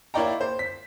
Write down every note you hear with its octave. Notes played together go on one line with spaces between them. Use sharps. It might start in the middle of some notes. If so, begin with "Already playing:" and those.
A#3 E4 C#5 D5 G5 A#5
C5
B6